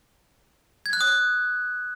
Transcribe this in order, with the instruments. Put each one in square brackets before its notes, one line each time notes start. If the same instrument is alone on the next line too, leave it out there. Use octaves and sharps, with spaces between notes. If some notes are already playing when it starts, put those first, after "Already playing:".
[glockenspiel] G#6
F#6
D#6